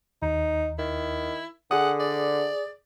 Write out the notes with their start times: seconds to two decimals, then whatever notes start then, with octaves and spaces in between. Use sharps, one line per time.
0.22 D#2 D#4
0.79 D#3 E4
1.71 D3 G#4 F#5 D#6
2.00 D5